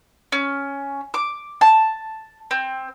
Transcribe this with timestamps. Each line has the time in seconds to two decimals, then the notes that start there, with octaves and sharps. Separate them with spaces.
0.32 C#4
1.14 D6
1.61 A5
2.51 C4